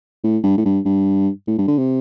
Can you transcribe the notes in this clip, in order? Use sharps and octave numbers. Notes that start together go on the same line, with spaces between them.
A2
G2
A2
G2
G2
A2
G2
D3
C3